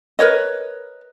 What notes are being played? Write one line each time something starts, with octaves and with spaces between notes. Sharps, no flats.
A#4 B4 C#5 D#5